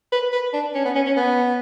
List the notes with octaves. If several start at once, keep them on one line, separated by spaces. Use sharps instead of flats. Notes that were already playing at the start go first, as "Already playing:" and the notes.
B4
B4
D4
C#4
B3
C#4
C#4
B3